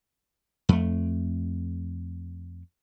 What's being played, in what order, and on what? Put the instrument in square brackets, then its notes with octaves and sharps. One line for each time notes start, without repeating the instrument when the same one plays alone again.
[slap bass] F2 A3